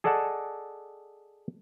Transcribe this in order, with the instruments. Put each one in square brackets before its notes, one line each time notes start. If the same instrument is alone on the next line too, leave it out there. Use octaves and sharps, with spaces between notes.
[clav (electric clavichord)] G#4 A4 D5 D#5 F#5 A5